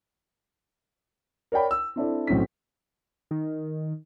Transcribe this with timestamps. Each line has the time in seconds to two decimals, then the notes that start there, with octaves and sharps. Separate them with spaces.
1.52 A#4 C#5 D5 G5 B5
1.71 E6
1.96 C4 D4 E4 A4 D5
2.27 B1 A2 C4 C#4 B6
3.31 D#3